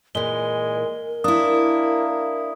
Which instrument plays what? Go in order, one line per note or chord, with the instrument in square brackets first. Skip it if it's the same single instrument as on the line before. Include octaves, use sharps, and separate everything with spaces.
[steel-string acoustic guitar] A#2 E3 [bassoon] G#3 [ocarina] A#4 [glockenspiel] G7
[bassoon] A#3 [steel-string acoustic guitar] D4 E4 [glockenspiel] D#6